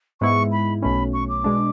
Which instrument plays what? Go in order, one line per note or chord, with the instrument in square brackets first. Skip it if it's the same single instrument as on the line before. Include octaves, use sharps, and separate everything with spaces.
[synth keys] G#2 G#3 B3 E4 [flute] C#6
[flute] B5
[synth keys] B1 B2 A3 C#4 [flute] B5
[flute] C#6
D6
[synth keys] B2 G#3 D4